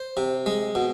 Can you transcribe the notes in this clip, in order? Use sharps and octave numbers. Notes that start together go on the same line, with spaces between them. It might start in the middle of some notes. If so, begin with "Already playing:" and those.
Already playing: C5
C3
G#3
B2